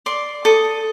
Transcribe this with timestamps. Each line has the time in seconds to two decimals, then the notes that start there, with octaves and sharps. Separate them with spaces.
0.06 D5 C6
0.45 A4 D#6